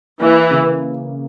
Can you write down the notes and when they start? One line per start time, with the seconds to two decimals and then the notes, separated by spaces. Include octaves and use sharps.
0.21 E3 A#3
0.51 C#3